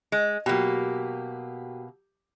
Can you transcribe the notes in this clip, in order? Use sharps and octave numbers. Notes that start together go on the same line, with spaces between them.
G#3
B2 F#3 A#3 G4